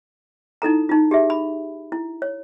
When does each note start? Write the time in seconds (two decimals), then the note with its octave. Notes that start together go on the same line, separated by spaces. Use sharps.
0.62 D#4 E4 A4 A#5
0.89 D#4 F4
1.11 G4 G#4 E5
1.30 B5
1.92 E4
2.22 C#5